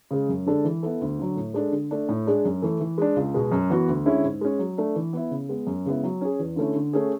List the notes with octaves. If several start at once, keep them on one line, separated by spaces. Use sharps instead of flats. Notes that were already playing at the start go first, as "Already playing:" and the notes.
C#3 G#3
F#2
D3 G#3 D4 A4
E3
B3 E4 A4
D2
D3 F#3
A2
G#3 D4 A4
D3
A3 D4
A2
G#3 D4 G#4
F#2
E3 A3
E3
G#3 D4
C#2
B2 G#3
F#2
E3 B3 F#4
D2
D3 G#3 C#4 E4
G#2
G#3 C#4
F#3
A3 D4
E3
B3 E4
C#3
G#3 B3
F#2
C#3 G#3 B3 E4
F#3
C#4 G#4
E2
D3 A3 C#4 E4
D3
A3 C#4 G#4